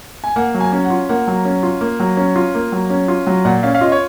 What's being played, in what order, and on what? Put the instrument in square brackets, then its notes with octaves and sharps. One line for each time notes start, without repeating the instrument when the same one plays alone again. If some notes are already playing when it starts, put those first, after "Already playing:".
[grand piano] G#5
A#3 F#5
F#3
G#5
C#4
F#5
F4
A#3 F#5
F#3
C#4
F4
A#3
F#3
C#4
F4
A#3
F#3
C#4
F4
F#3
A#2 F#5
C#4 F5
F5
F4 D#5
C#5